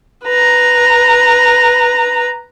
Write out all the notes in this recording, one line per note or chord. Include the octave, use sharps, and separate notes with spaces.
B4 A#5